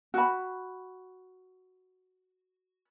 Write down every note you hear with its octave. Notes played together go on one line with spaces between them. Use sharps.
F#4 B5